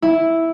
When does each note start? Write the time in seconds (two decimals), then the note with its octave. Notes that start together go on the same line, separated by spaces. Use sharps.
0.02 E4